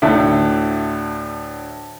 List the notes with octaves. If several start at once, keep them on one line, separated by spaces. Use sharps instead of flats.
D2 A2 E4